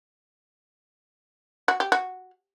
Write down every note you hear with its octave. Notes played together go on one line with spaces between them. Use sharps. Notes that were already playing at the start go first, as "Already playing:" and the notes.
F#4
G4
F#4